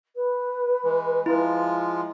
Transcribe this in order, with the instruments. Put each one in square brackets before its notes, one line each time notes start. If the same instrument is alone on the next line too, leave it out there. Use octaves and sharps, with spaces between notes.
[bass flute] B4
[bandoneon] E3 G#3
[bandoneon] F3 G#3 F4 [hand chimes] E4